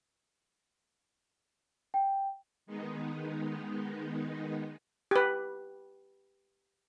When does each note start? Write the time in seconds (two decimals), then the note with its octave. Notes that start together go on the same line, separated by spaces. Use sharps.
1.94 G5
2.66 D#3 G#3 B3 D#4
5.11 G4 B4